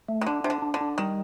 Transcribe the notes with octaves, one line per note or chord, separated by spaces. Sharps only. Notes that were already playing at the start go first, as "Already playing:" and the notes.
A3
D#3
D3 D4
C3 D4
D3
D4
D3
D4
D#3 G3